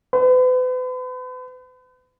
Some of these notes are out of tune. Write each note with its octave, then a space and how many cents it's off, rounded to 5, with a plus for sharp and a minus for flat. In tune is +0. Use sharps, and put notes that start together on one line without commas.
B4 +40